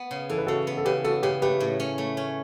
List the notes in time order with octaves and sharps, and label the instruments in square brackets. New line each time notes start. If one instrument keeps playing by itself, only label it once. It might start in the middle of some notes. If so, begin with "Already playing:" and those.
Already playing: [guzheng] B3
C#3
[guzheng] E3 [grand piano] A4
[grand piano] B4
[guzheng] C#3 [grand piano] F#4 A4
[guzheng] B3
[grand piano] A4
[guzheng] C#3 [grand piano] G4 B4
[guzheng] B3 [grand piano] F#4 A4
[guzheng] C#3 [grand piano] G4 B4
[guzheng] A3 [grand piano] G4 B4
[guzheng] A2
C#4
A3
C#4